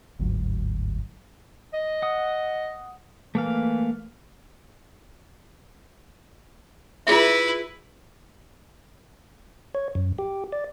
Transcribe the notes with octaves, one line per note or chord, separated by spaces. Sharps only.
G1 D2 G#2 F#3
D#5
F#5 D#6
E3 A3 A#3 F5
E4 F4 G#4 B4 E5
C#5
F#2
G4
D5